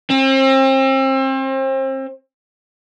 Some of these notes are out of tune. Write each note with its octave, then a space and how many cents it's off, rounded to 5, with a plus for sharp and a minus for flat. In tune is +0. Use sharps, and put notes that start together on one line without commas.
C4 +35